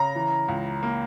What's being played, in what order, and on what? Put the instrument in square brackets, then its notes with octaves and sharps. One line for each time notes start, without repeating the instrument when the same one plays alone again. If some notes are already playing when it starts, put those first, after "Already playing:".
Already playing: [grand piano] C#3 [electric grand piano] A#5
[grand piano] E3
C#2
A#3